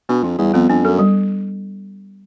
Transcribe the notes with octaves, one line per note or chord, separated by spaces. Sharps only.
B2 D4
F2 F4
E2 G3
F2 B3
F2 D4
F#2 A4
G3